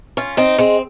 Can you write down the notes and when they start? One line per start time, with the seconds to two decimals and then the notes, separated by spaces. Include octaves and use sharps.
0.17 C#4 F4
0.37 C4 D#4
0.58 G#3 C4